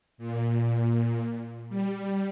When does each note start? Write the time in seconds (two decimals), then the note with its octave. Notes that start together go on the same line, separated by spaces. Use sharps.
0.18 A#2
1.69 G3